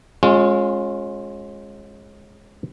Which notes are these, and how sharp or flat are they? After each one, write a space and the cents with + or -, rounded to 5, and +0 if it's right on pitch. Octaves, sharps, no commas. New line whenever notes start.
G#3 +0 C#4 -30 F4 +30